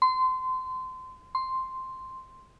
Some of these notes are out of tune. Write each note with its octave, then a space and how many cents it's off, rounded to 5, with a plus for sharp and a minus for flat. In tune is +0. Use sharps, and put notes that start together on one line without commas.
C6 -25
C6 +0